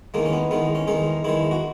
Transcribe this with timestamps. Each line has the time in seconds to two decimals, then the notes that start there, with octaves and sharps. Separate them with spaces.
0.14 E2 D#3 G#3 A#3
0.26 C#4
0.33 B3
0.51 E2 D#3 G#3 B3
0.75 C#4
0.87 E2 D#3 G#3 D#4
1.24 E2 D#3 G#3 E4
1.51 F#4